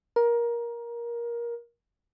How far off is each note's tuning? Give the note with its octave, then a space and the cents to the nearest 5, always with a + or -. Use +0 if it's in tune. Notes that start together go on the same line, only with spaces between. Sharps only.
A#4 +20